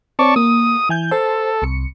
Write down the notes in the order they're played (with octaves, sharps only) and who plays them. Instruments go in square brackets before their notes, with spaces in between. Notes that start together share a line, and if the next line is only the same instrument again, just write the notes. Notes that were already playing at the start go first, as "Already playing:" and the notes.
[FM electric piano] C4 C#5 [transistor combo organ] D5 A5 C#6
[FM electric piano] A#3 [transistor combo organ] D#6
[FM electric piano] E3 G#5 G6
[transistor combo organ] A4 [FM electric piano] C5 A5
[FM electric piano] C2 C#7